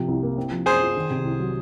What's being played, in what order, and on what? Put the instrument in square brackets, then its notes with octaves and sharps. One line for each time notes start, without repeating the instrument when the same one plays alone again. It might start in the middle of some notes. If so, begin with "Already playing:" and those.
Already playing: [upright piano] C3 F3
C2
A#3
C4
F3
[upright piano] F#2 [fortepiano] G#4 C5
[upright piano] F4
D#3
C3
C2
F#3